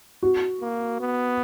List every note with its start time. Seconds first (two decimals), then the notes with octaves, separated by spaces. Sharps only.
0.23 F#4
0.61 A#3
1.00 B3